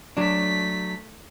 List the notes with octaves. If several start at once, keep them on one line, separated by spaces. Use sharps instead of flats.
F#3 A3 D4 B6